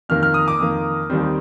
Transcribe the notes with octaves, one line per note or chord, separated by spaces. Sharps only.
F2 D#3 A#3 F6
F6
D#6
D6
F2 D#3 A#3
D#2 D#3 G3 C4